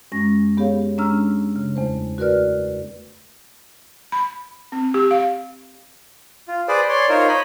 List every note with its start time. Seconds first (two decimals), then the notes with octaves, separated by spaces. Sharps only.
0.12 F#2 G#3 C#4 A#6
0.57 B3 G4 G#4 C#5 F5
0.98 G#3 C#4 D4 A#5 E6 F6
1.56 C#3
1.75 E2 A3 C5
2.18 F#4 A#4 B4 D5 F6
4.12 B5
4.72 C4
4.94 G4
5.11 F5
6.48 F4
6.68 G#4 B4 C5 D5
6.89 C#5 D5 C6
7.09 D#4 F4 A#4 C5 C#5
7.28 C#5 D#5 B5